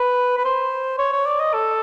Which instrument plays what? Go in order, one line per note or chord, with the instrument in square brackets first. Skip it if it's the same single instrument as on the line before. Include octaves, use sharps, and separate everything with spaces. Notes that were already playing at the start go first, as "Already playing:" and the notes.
Already playing: [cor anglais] B4
B4
C5
C#5
C#5
D5
D#5
A4